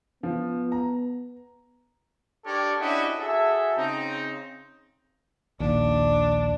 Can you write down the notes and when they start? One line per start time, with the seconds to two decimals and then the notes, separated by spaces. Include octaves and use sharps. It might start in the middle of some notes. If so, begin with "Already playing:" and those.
0.23 F3 B3
0.72 A#5
2.45 D4 G4 A4 A#4 C#5 D5
2.80 C#4 D4 E4 F#4 G4 D#5
3.18 F#4 G#4 A4 E5
3.77 C#3 C4 D#4
5.60 A#1 D#2 D4